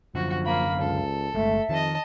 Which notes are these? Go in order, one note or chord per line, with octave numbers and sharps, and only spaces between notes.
F#2 D3 F3 F#4
A#3 F5 B5
C#2 A4
G1 G#3 A3 E5
F2 D#3 D#5 A5